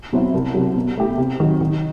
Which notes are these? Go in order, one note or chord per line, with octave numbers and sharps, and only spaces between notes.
B2 F#3 C4 E4
C2
C3 F#3
B2
A3 E4 G4
C3
D#3 F#3
D#3